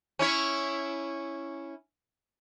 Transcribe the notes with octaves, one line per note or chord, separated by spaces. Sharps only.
C#4 E4 C#5